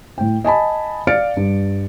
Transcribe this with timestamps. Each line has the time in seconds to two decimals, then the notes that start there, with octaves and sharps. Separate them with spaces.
0.18 A2 G5
0.44 D#5 G#5 A5 B5
1.07 D5 F5 F6 A6 C#7 D7
1.37 G2